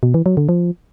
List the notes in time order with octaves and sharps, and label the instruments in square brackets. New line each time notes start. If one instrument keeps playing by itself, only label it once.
[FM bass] B2
E3
F#3
D3
F3